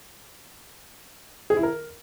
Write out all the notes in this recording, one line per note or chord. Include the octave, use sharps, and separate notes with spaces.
G#4
E4
A#4